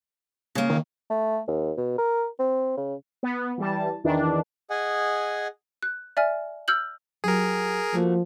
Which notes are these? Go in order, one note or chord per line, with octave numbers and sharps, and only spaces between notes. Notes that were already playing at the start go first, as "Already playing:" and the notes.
C#3 A#3
D#3
A3
D#2
B2
A#4
C4
C#3
B3
E3 G3 A5
E2 D#3 E3 D4
G#4 D#5 F#5 G#5
F#6
D5 E5 G#5 F6
E6 F6 G6 F#7
F#3 G4 G#4 A#4
F3 A3 A#3 F#4